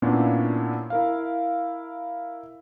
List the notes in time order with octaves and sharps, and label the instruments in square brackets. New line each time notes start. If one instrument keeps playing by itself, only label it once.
[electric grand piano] A#2 A#3 B3 C#4 D4 E4
E4 A#4 F5